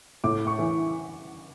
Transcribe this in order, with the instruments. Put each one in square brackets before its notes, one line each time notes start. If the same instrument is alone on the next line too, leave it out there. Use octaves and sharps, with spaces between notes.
[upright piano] A2 [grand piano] D6
[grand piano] C#6
[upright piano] E3